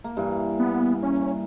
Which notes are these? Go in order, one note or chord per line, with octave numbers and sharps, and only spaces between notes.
A#3
G2 E3
B3
C#4